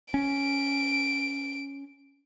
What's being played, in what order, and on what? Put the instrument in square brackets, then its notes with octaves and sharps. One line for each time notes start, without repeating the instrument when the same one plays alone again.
[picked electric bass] C#4 [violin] D7